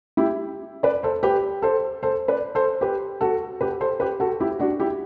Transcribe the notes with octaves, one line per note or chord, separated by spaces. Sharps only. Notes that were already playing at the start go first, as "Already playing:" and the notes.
E4 G4
B4 D5
A4 C5
G4 B4
A4 C5
A4 C5
B4 D5
A4 C5
G4 B4
F#4 A4
G4 B4
A4 C5
G4 B4
F#4 A4
E4 G4
D4 F#4
E4 G4